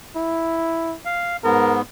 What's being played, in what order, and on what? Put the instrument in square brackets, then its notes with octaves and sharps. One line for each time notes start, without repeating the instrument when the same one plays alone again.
[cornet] E4
[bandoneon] F5
[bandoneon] G#2 B3 [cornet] A#4